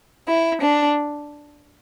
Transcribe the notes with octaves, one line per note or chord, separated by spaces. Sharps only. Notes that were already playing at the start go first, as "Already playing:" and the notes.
E4
D4